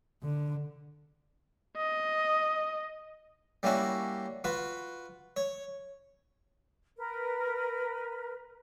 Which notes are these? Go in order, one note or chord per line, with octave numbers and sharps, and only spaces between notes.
D3
D#5
G3 A#3 C#4 E4 F#4
F4 F#4 B4
C#5
A#4 B4